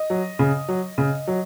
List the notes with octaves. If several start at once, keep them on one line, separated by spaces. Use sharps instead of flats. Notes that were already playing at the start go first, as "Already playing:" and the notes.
Already playing: D#5
F#3
C#3
F#3
C#3
F#3